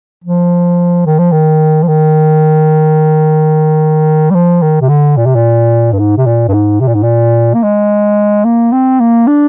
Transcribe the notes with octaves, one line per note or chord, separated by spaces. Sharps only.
F3
D#3
F3
D#3
F3
D#3
G3
F3
D#3
C3
D3
A#2
C3
A#2
G2
G#2
C3
A#2
G2
G#2
C3
A#2
G#2
A#2
A#3
G#3
A#3
C4
A#3
D4